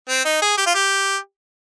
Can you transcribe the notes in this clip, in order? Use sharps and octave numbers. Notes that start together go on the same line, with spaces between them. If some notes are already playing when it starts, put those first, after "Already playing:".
C4
D#4
G#4
G4
F4
G4